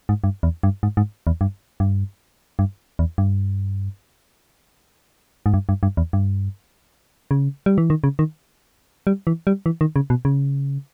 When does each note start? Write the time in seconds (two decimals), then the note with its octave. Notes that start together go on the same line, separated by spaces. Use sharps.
0.09 G#2
0.24 G2
0.43 E2
0.63 G2
0.83 G#2
0.97 G#2
1.27 E2
1.41 G2
1.80 G2
2.59 G2
2.99 E2
3.18 G2
5.46 G#2
5.54 G2
5.69 G2
5.83 G2
5.97 E2
6.13 G2
7.31 C#3
7.66 G3
7.78 E3
7.90 D#3
8.04 C#3
8.19 D#3
9.07 G3
9.27 E3
9.47 G3
9.66 E3
9.81 D#3
9.96 C#3
10.10 B2
10.25 C#3